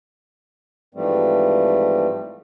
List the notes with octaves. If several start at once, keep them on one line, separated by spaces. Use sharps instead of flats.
G#2 E3 F3 G3 A3 C4